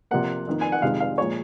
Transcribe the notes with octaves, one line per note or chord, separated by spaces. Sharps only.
C3 F3 A#3 F#5
F2 D#3 A#3
G#5
F#5
F2 C3 D#3 G#3 F5
F5
A#2 F3 G#3 C#5